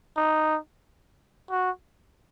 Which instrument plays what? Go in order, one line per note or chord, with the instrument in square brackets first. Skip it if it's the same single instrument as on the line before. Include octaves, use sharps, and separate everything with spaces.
[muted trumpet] D#4
F#4